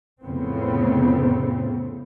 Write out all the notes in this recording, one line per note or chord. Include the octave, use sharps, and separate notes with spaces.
F2 A2 C#3 B3 C4